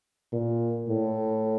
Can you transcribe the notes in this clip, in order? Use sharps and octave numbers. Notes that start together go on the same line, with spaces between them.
A#2
A2